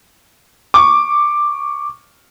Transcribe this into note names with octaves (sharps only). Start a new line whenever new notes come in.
C#6 D6